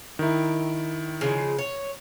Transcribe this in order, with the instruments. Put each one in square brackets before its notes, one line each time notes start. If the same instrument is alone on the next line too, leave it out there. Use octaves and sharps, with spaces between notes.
[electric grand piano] D#3 E4
[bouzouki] C#3 F3 G#3
C#5